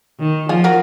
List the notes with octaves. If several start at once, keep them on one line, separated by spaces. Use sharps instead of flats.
D#3
F3 F4 G#4
F#4 A#4